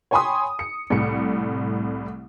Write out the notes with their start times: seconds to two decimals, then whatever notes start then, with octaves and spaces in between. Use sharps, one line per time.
0.11 C#5 G5 G#5 B5 C6 D#6
0.59 C#7
0.90 C2 A2 C#7